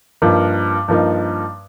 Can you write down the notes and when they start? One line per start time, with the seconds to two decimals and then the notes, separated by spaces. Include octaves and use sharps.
0.22 G2 F3 A#3 D#4
0.88 G2 F3 A#3 D#4